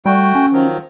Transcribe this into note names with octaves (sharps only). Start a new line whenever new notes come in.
G3 A3 F#4 G5
C#4
D#3 F3 F#3